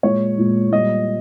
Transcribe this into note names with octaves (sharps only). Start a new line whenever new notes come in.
A#2 G#3 C#5
A#2 G#3
A#2 G3 D#5